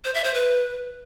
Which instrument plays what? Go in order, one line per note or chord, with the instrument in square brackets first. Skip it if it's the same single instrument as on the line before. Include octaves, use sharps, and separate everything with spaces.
[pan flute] C5
E5
C5
B4